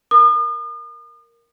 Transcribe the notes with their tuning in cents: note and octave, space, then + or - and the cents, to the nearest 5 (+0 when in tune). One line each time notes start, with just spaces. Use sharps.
A#4 +0 D#6 -45